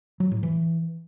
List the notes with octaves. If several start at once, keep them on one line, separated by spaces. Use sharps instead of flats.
F#3
A2
E3